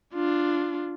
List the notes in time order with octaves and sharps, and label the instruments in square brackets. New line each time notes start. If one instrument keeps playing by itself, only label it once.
[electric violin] D4 F4